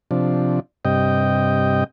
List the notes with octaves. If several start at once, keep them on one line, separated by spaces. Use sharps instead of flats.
C3 F3 D4
G2 C3 D#5 G5